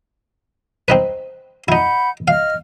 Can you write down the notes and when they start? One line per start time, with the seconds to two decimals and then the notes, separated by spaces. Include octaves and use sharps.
0.88 C4 D#4 B4
1.68 D#4 E4 F#5 B5 G6
2.28 D#5 F5 F6